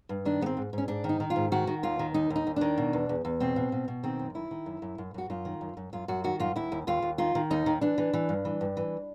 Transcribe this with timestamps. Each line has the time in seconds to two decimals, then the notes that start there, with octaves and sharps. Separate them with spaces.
0.09 G2
0.25 D#3 D4
0.41 G#2 B3
0.46 C4
0.57 G#2
0.73 G#2 C#4
0.88 G#2 D4
1.04 D#3
1.09 D#4
1.20 D#3
1.30 F4
1.36 G#2
1.52 D#3 F#4
1.67 D#3
1.83 D#2 F4
1.99 D#3
2.14 D#2 D#4
2.30 D#2
2.36 D#4
2.47 D#2
2.56 D#3 D4
2.78 B2
2.93 E2
3.09 E2
3.25 E2
3.40 B2 C4
3.56 B2
3.72 B2
3.88 B2
4.04 D#3 C4
4.19 F#2
4.35 D#3 E4
4.51 D#3
4.66 F#2
4.82 F#2
4.98 F#2
5.14 F#2 F#4
5.30 F#2 F4
5.45 D#3
5.61 F#2
5.77 F#2
5.93 F#2 F4
6.08 F#2 F#4
6.24 D#3 F#4
6.40 F#2 F4
6.56 D#2 E4
6.72 D#2
6.87 D#2 F4
7.02 D#2
7.18 D#3 F4
7.35 D#3
7.50 D#2 D#4
7.66 D#3
7.81 E3 D4
7.98 E3
8.13 E3
8.29 G2
8.45 E3
8.61 G2
8.77 E3